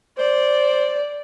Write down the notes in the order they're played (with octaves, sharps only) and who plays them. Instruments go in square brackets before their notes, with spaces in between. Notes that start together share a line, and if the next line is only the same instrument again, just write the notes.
[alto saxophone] C5 [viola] D5